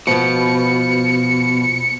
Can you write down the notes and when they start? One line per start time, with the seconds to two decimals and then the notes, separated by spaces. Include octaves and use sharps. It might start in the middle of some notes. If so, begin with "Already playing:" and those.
0.07 B2 F3 B3 C#7